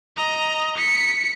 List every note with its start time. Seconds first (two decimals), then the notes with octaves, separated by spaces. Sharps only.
0.17 D#5 A#5
0.77 B6 C#7